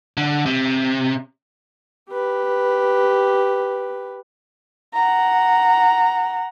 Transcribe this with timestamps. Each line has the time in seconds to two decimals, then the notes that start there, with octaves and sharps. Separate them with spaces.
0.17 D3
0.46 C3
2.10 G4 B4
4.94 F#5 A#5